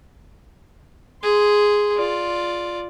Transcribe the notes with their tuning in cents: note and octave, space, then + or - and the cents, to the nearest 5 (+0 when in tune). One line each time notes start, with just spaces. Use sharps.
G#4 +0 C6 -10
F4 +0 D5 +0